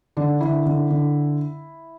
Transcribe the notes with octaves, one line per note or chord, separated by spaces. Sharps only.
D3 D4
D3 E4
D3
D3